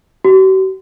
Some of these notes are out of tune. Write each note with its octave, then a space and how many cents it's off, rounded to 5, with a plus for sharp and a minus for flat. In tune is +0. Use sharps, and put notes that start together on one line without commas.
F#4 +45